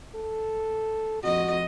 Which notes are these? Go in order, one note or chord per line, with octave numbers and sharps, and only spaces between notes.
A4
F2 F#4 D#5